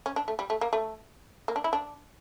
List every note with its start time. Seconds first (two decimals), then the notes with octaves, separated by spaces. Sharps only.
0.06 C#4
0.16 D4
0.28 A3
0.39 G3
0.50 A3
0.61 A#3
0.73 A3
1.48 A#3
1.56 D4
1.64 E4
1.73 D4